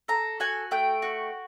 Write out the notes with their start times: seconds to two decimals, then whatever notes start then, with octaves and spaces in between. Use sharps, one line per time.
0.08 A4 A#5
0.40 F#4 G#5
0.71 A3 G5
1.02 F#4